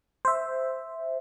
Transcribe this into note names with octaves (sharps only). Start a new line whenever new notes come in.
C5 E5